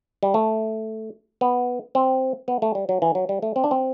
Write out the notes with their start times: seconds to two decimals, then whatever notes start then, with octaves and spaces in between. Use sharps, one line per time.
0.23 G3
0.34 A3
1.41 B3
1.95 C4
2.48 B3
2.62 A3
2.75 G3
2.89 F#3
3.02 E3
3.15 F#3
3.29 G3
3.42 A3
3.56 C4
3.64 D4
3.71 C4